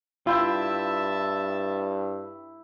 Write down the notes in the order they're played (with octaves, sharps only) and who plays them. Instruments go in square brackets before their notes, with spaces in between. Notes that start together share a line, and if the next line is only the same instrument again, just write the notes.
[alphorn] G2 [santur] E4 G5 [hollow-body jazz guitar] F4 [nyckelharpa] E5 A5